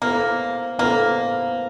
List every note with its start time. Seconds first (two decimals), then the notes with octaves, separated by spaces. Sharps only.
0.02 A#3 B3 E4 A4 C5
0.79 A#3 B3 E4 A4 C5